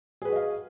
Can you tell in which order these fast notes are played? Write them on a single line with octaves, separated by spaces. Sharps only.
G#4 B4 F#4 D#5 F5